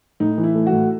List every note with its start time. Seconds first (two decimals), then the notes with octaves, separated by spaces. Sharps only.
0.20 A2 D#4
0.38 E3
0.43 E4
0.55 A3
0.67 F#4
0.72 A2